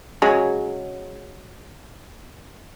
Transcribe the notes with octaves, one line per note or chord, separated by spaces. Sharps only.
C#3 F#3 G#3